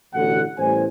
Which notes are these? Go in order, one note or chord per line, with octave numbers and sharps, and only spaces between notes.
A1 B2 D3 F#5
A1 A2 G3 B3 C5 G#5